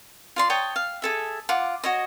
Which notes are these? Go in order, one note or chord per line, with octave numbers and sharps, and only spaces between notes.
F4 D5 C6
C#5 G5 A5 D#6
F5
G#4 A4 E5
F4 F#5 D6
F#4 C#5 D#5